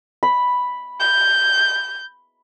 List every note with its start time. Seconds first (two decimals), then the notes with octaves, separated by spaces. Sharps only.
0.23 B5
1.00 G6